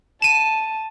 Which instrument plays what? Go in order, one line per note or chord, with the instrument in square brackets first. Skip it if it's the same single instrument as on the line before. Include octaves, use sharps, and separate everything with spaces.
[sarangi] A5 [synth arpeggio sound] D#7 E7